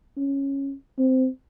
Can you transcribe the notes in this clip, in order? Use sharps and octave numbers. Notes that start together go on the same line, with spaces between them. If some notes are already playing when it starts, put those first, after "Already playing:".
C#4
C4